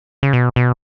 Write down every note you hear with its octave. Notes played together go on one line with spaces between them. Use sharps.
C#3
B2
B2